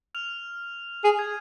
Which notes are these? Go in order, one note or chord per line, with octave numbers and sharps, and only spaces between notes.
F6 F7
G#4 D#6 D#7
G#6